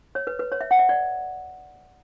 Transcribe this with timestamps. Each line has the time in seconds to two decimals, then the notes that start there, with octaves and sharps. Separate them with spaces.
0.15 C#5
0.27 B4
0.39 B4
0.52 C#5
0.61 E5
0.71 F#5
0.79 E5
0.89 D5